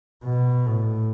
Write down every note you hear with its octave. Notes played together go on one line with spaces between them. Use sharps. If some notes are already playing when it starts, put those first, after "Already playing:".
B2
A2